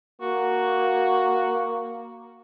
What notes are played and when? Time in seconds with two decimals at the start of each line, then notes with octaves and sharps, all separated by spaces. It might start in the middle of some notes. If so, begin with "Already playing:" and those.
0.21 A#3 F#4